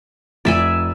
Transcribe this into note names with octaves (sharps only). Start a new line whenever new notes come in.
F1 D5 E5 G#5